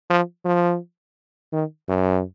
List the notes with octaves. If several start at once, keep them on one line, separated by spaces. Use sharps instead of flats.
F3
F3
D#3
F#2